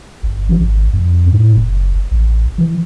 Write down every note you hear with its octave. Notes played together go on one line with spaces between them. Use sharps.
G1
E3
G#1
F2
A2
F#1
A1
E3